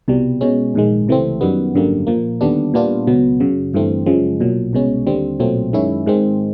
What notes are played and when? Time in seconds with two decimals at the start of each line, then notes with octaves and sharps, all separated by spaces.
0.08 C2 B2 G3
0.41 B2 G#3 C#4
0.74 A#1 G#2 D#3 G#3
1.08 C#2 C3 E3 A3 C4
1.41 F#2 D#3 G3 B3
1.74 G#1 F#2 D3 G3 A#3
2.07 A#2 F3 A#3
2.41 D#2 D3 G3 B3 D4
2.74 A#2 G3 B3 D4 F4
3.07 C#2 B2 F#3 B3
3.40 F#2 C#3 F#3
3.74 G1 G2 E3 A3 C4
4.06 F#2 C#3 F3 G#3
4.40 B1 A#2 F#3
4.73 C2 B2 G#3 C#4
5.06 D#2 D3 G3 C4
5.40 B1 A#2 F#3 A3 C4
5.73 F#2 D#3 G#3 C#4 E4
6.06 G#2 D#3 G#3 C4